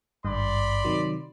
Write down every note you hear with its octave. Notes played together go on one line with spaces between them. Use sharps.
G#1 G2 D5 B5 C6
C3 D#3 F#3